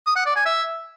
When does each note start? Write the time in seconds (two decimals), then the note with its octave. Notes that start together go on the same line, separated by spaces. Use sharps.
0.07 D#6
0.16 F#5
0.26 D5
0.36 G#5
0.46 E5